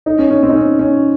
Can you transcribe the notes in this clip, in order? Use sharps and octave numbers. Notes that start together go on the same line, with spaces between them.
D#4
C#4
C#4
C4
D#4
C#4
C#4